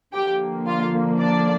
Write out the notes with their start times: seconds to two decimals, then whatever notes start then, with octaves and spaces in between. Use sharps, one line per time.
0.13 D3 F3 A#3 G4 G5
0.66 F4 F5
1.20 D4 D5